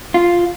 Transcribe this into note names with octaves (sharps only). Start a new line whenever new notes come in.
F4